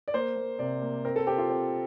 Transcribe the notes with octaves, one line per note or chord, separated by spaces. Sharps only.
D5
A#3 C5
A#3
C3 D5
A#3
C4 A#4
A4
C4 G4
F4
C4